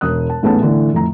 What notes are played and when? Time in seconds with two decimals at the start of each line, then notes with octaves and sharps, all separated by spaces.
0.01 E1 D#6 F#6
0.30 A5
0.43 A1 G#2 A3 B3 C#4 A5
0.61 A2 D3 E3
0.94 F2 A2 A#5